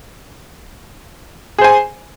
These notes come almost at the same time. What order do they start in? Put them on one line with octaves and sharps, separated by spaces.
G#4 C5 G#5